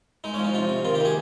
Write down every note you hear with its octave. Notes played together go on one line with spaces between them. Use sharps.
G#3 D#4
C#4
F3
D#4
C3 F4
C3
D#3 F4
G4
A#3 G#4